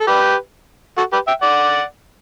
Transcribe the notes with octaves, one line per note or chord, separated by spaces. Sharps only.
A4
G4 B4
F#4 A4
G4 B4
E5 G5
D5 F#5